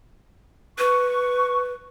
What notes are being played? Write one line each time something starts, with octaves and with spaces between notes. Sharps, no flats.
B4 C#6